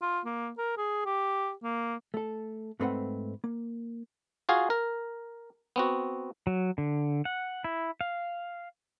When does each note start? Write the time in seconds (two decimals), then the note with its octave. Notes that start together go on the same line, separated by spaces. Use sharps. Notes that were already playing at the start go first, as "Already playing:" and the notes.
0.02 F4
0.25 A#3
0.58 A#4
0.77 G#4
1.06 G4
1.63 A#3
2.14 A3 A4
2.80 G#2 A3 C4 B4 F#5
3.44 A#3
4.49 F4 F#4 G#4 F5
4.70 A#4
5.76 B3 C4 F#4
6.47 F#3
6.78 D3
7.25 F#5
7.64 E4
8.01 F5